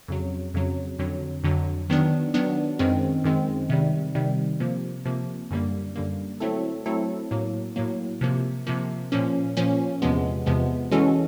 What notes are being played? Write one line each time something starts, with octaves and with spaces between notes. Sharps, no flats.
F2 C#3 F#3
F2 C#3 F#3
F2 D3 F#3
F2 D3 F#3
D#3 F#3 B3 D4
D#3 F#3 B3 D4
F#2 D#3 G#3 C4
F#2 D#3 G#3 C4
C3 D#3 G3
C3 D#3 G3
C3 F3 A#3
C3 F3 A#3
F#2 D3 G3 A#3
F#2 D3 G3 A#3
F#3 A3 C4 E4 A4
F#3 A3 C4 E4 A4
A2 F#3 A#3
A2 F#3 A#3
C3 F3 A#3
C3 F3 A#3
A#2 F3 A#3 C#4
A#2 F3 A#3 C#4
E2 C3 F3 G#3 B3
E2 C3 F3 G#3 B3
E3 G#3 C#4 F#4 A4